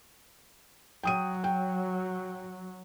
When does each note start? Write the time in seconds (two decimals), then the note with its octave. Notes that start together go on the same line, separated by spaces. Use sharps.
1.03 F#3 G5 D#6 D#7
1.44 G5